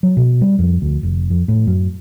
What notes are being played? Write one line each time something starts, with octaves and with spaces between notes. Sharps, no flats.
F#3
B2
G3
F2
D2
F1
F2
A2
F#2